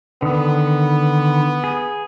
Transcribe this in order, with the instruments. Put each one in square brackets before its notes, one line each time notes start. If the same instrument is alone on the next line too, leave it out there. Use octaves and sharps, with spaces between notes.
[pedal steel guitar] D3 D#3 D#6 [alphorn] B3
[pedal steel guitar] G#4